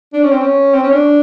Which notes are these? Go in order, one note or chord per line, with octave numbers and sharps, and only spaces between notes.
D4
C#4
C4
C#4
C4
C#4
D4